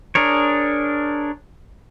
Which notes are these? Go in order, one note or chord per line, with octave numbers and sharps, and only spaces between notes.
D4 G#4 A#4 C#5